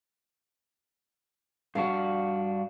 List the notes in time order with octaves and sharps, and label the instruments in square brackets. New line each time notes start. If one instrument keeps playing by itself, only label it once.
[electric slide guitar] G2 D4 F#4 [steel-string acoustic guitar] F5